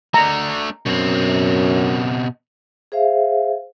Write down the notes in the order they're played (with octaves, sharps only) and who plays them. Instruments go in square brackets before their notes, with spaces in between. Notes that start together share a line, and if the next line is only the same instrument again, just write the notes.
[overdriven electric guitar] A3 D4 [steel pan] A#5
[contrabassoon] F#2 [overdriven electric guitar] B2 C4
[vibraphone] G#4 C5 E5 F5